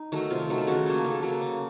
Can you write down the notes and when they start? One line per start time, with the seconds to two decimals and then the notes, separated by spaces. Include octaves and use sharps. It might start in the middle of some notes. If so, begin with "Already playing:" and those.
Already playing: D#4
0.12 D#3 F#3 A3
0.30 C3 F4
0.50 D#3 F#3 A3
0.58 A4
0.67 C#3 F#4
0.86 F#3 A#3
1.04 C#3 A4
1.23 F#3 A#3 A4
1.41 C#3